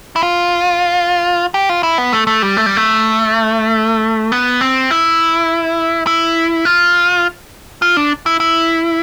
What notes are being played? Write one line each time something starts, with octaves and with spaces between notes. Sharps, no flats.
E4
F4
G4
F4
E4
B3
A3
A3
G3
A3
G3
A3
B3
C4
E4
E4
F4
F4
D4
E4
E4